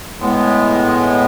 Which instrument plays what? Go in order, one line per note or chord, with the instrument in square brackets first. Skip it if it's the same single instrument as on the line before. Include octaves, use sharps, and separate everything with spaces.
[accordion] A2 G#3 B3